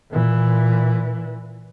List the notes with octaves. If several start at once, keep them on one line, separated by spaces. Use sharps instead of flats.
A#2 E3